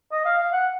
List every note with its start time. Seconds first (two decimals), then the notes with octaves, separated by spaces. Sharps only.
0.12 D#5
0.25 F5
0.38 F5
0.53 F#5